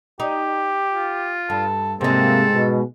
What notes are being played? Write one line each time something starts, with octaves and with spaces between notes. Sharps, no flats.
D#4 G4
F4
G2 A4
G#2 C3 G#3 A#3 C4 A4
B2